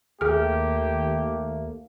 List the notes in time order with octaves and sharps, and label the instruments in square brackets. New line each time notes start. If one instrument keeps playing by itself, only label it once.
[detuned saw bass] D#2 [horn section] A3 A#3 [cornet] G4 [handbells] G#4 F6